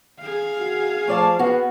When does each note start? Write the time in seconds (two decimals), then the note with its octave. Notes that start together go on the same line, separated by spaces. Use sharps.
0.21 G#4 F5
0.59 F#4
1.08 F3 A3 D5 A5
1.39 B3 F#4